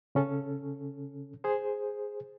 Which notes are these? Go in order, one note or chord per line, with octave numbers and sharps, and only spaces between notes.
C#3 C#4 A4
G#4 C5